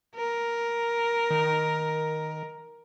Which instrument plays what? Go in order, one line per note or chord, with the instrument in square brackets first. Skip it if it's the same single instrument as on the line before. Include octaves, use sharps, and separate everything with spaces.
[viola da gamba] A#4
[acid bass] D#3